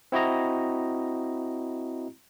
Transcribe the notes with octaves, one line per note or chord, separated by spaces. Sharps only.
C4 E4 F#4 D#5 A#5